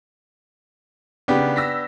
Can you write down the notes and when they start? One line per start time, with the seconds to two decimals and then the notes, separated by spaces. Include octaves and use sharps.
1.28 C#3 B3 D4 D#4 G4
1.56 E6 A#6 B6